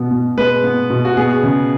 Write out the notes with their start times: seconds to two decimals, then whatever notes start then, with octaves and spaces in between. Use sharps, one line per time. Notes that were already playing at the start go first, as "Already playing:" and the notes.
Already playing: B2 B3
0.11 B2
0.37 G#3 B4
0.64 B3
0.90 B2
1.05 F#4
1.17 B3 G#4
1.43 C#3